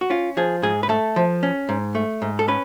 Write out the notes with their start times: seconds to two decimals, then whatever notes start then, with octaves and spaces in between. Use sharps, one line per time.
0.01 F#4
0.10 C#4 F4
0.37 F3 G#4
0.62 G#2 G#4
0.83 B4
0.89 A3 A4
1.16 F3
1.43 C#4
1.69 G#2
1.95 A3
2.22 G#2
2.39 A4
2.48 C#4 B4